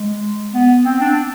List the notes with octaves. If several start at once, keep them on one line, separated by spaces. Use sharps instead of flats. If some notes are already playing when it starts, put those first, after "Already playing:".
Already playing: G#3
B3
C4
D4